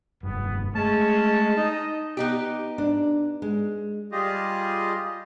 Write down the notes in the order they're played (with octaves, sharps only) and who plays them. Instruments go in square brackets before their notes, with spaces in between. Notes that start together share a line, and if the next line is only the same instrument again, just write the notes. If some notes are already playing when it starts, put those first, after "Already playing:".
[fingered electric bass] F1 G2 [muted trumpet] B3
[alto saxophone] G#3 [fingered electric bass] A3 [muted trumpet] C#4 [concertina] A5
[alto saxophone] D#4 [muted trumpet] D#5
[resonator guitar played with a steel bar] B3 D#4 G4
[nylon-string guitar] D4
G#3
[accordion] G3 F4 G4 G#4 D#5